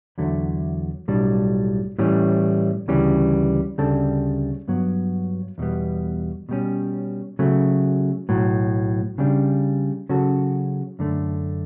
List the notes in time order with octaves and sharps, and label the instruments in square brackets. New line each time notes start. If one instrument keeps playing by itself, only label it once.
[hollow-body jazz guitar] E2 D3 F#3 A3
B1 A2 G3 D4
A2 E3 G3 C#4
D2 C#3 E3 G3 C#4
D2 C#3 G3 D4 A4
G2 F#3 B3
E2 B2 G3 B3
B2 G3 C#4
C#3 F#3 A3
B1 A2 F#3
C#3 G3 D4
C#3 F#3 C#4 F#4 A4
F#2 D3 A3